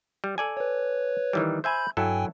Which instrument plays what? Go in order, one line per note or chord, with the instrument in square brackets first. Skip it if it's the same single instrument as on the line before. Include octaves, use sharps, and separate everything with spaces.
[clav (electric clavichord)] G3
A4 D5 G#5
[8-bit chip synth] B4 C#5
[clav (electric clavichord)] D#3 E3 G3
[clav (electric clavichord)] C5 E5 G#5 [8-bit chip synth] B5 G6
[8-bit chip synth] G2 G5 G#5 [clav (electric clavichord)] F#3 E4 A4